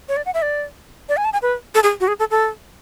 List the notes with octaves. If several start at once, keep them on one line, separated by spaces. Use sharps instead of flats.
C#5
D5
F#5
E5
D5
D5
G#5
A5
G#5
B4
A4
G#4
F#4
G#4
A4
A4